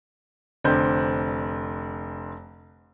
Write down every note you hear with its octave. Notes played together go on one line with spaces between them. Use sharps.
F1 D3 C4 G6